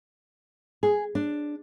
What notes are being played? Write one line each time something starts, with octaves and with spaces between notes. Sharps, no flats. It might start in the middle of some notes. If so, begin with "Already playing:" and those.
G#4
D4